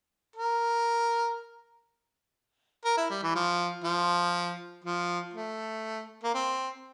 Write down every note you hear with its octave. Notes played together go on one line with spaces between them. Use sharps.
A#4
A#4
E4
G3
E3
F3
F3
F3
A3
A#3
C4